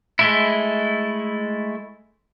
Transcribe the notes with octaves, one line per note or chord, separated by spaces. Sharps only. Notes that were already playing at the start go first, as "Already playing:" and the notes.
G#3 A3 E4